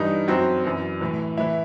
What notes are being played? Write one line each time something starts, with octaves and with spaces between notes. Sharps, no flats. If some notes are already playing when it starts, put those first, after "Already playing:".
Already playing: G2 E3 D#4
F#2 F#3 C4
F#2 E3
A2 E3
A2 E3 E4